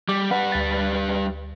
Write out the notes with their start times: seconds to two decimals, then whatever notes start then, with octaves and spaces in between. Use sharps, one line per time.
0.09 G3 D6
0.31 G3 B4 F#5
0.52 D2 A6